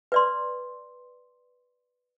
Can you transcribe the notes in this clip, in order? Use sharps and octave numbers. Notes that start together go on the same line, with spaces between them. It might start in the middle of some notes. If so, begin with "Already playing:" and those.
B4 D5 C6